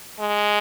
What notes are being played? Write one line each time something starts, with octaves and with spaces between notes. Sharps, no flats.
G#3